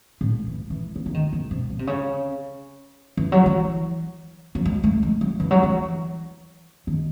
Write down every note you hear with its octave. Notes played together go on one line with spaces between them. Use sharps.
A2
E3
E3
F#3
E3
D#3
C#3
C3
C#3
C3
C#3
E3
F#3
E3
F#3
G#3
A3
G#3
F#3
E3
F#3
E3
D#3